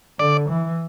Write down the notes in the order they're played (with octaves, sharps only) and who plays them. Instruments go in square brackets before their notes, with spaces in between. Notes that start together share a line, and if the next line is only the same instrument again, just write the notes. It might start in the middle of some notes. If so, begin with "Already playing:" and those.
[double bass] D3 [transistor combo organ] D5
[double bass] E3